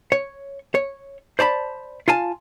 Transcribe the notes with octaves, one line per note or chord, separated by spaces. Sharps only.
C#5
C#5
C5 D5 A5 B5
F4 F5 G#5 A5